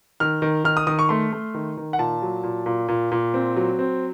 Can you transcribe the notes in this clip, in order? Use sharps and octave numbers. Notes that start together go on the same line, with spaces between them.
D#3 F6
D#3
D#3 F6
D#6
D#3 D#6
C#6
A3 C6
A3
D#3
D#3
F#5
A#2 A5
F#3
A#2
A#2
A#2
A#2
C4
F#3
C4